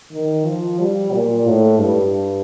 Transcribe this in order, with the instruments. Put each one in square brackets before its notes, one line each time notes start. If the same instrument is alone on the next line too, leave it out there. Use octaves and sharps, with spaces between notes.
[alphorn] D#3
F3
G3
A#2
A2
G2